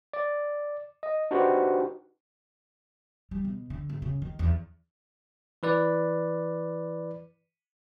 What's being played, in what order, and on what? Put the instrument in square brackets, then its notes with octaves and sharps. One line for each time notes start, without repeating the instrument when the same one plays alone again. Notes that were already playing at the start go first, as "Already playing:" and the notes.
[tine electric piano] D5
D#5
D4 D#4 F#4 G4 B4 C5
[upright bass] G3
B2
D3
G#1
C#3
D#3
E2
[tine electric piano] E3 B4 D5